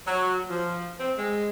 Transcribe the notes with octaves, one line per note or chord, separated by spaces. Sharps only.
F#3
F3
C4
G#3